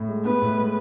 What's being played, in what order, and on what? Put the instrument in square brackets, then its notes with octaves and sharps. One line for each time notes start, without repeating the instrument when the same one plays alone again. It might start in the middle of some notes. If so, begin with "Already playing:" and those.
Already playing: [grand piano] A2
G#3
[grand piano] B3 [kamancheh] B4
[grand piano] A2
G#3